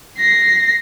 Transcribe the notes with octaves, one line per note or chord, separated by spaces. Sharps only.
A#6 C7